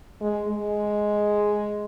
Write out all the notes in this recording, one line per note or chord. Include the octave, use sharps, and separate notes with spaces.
G#3
G#3